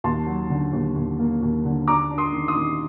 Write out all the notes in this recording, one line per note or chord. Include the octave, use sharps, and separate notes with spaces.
D#2 A5 C6
F#3
D3
D#2
D#2
A#3
D#2
D3
D4 A#5 D6
D4
C6 D#6
D#3
C6 D#6
D#3